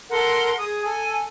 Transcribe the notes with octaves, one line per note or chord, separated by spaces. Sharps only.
A4 A#4 F#5 C6
G#4 D#6
A4 G#5